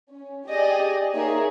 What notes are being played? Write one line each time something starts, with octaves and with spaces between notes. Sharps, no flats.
C#4
G4 G#4 D5 D#5
A#3 D#4 G#4 A#4 C#5 E5